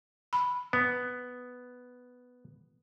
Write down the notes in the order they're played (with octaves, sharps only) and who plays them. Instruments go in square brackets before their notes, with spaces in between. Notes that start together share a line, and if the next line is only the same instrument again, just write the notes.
[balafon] B5
[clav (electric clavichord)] B3